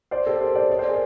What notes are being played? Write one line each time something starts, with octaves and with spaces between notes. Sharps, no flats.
C5 D5
G4 A4
A#4 C5
C5 D5
C#5 D#5
C5 D5
G#4 A#4